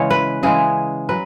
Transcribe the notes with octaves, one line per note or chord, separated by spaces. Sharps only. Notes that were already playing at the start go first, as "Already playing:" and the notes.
Already playing: C#3 E3 G#3 C#5
B4
C#3 E3 G#3 G#4
F#3 B4